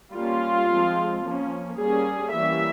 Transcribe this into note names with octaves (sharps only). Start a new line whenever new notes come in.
G3 A#3 C#4 F4
F3 G#3 C4
F3 A#3 C#4
G3 A#3 C#4 G#4
E3 G3 A#3 C#4 E5